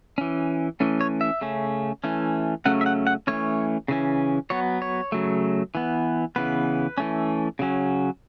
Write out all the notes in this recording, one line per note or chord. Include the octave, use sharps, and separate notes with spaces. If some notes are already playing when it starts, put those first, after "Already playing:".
E3 C#4
E3 A3 C#4
C#5
E5
C#3 A3 C#4
E3 A3 C#4
C#3 F#3 A3 C#4 F#5
E5
F#5
F#5
E3 A3 C#4 C#5
C#3 E3 C#4
F#3 B3 C#5
C#5
C#3 F#3 A3
E3 B3
C#3 E3 B3 B4
E3 A3 C#4
C#3 F#3 C#4